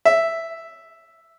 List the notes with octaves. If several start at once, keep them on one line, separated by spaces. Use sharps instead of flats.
E5